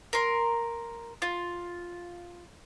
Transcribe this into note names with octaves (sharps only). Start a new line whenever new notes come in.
A#4 C6
F4